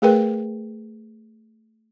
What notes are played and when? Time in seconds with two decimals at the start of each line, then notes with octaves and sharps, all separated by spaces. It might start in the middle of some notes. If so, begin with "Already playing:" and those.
0.02 A3 G#4 A#4 B4 G5